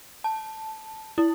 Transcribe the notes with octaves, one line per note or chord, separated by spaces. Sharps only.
A5
E4